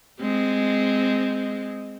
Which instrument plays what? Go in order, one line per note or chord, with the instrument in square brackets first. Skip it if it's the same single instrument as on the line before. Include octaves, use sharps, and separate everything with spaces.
[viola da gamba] G#3 C4